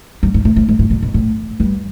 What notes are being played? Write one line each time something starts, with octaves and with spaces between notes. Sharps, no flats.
G2
G#2
A2
A2
G#2
A2
B2
B2
A2
G2